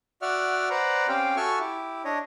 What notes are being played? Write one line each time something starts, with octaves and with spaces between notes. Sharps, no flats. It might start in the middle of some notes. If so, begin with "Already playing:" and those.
F#4 D5 E5 F#5 F6
B4 C5 D5 F#5 A#5
C4 C#4 G4 C5 F5 G5
F#4 A4 E5 G#5 C#6 F6
E4 G4
D4 C#5 D#5